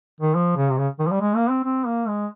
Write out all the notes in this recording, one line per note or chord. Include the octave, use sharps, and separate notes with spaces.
D#3
F3
C#3
C3
C#3
D#3
F3
G3
G#3
A#3
C4
C4
A#3
G#3